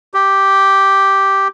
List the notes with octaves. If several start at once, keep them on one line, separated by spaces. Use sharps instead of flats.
G4